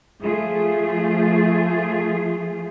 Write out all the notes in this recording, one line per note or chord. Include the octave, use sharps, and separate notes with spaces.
F3 A3 F4 G#4